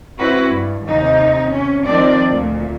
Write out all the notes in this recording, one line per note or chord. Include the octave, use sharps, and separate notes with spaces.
C4 E4 F#4 B4
G2
D#2 C3 D#4
C3 C#4
D#3 F3 C4 D4 D5
D2 A#2